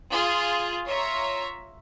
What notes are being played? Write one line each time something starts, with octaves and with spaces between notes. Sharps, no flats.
F4 G#4
F4 C#5 E5 A#5